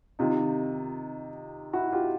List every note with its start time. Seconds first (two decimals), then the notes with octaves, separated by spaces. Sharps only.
0.19 C3 D#3 D#4 F4
1.73 E4 F#4
1.92 F4 G4